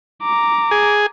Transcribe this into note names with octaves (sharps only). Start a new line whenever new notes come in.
A#5 D6
G#4